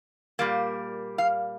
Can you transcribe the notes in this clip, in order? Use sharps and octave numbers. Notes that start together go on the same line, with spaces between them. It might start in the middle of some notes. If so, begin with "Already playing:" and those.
A#2 G3 A#3
F5